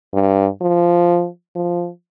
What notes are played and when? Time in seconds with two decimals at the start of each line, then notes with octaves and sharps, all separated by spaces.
0.14 G2
0.61 F3
1.56 F3